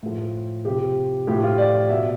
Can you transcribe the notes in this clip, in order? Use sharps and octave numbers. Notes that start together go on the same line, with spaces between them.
A2 F3
C3 F3 G4
A2 F3 G4
F4
D5
B2 E5